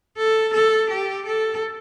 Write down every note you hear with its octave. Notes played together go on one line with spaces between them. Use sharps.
A4
A4
G4
A4